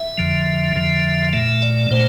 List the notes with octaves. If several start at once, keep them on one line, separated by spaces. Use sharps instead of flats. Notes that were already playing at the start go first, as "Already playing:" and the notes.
Already playing: E5
F2 D3 F3
F2 D3 F3
A#2 A3 E5
D5
A#2 A3 C5